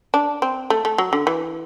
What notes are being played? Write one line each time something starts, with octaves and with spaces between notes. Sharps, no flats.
D4
C4
A3
A3
F#3
D3
E3